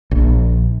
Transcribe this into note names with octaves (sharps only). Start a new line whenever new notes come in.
A#1